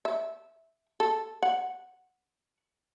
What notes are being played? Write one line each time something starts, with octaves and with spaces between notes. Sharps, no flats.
E5
A4
F#5